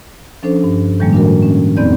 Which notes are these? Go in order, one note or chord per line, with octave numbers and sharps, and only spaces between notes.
F3 C#4 D4 A4 C5
G2
A2 D#3 F3 G3 G#3 A#3
D4 F#4 A#4
C#4
E2 B3 C4 D#4 D5 G6